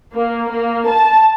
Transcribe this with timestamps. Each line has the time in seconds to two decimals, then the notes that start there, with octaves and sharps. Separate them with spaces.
0.13 A#3
0.52 A#3
0.89 A5